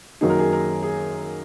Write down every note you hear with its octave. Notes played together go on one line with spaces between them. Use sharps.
F#2 D#3 F#3 A#3 D#4 G#4
A#4
G#4
A#4
G#4